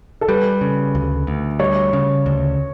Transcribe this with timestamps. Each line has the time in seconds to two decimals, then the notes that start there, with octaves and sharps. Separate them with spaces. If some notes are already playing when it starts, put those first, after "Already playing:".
0.21 A4
0.28 G3 B4
0.61 C#3
0.95 D2
1.27 D2
1.59 G3 C#5
1.93 C#3
2.26 D2